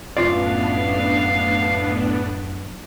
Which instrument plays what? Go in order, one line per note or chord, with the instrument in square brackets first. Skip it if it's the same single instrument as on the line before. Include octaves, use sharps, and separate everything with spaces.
[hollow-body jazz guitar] F#2 F4 D5 [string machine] A2 B3 D4 [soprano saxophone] F5